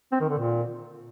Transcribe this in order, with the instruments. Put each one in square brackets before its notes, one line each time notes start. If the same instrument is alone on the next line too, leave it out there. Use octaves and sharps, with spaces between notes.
[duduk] C4
D#3
D3
A#2